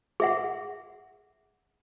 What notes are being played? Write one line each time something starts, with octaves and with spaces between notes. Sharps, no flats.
G#4 E5 F#5